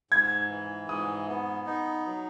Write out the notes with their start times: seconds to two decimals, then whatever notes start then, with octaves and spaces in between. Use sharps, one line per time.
0.11 G#2 G#6
0.50 E3
0.89 G#2 D#6
1.28 B3
1.66 D#4
2.06 F#3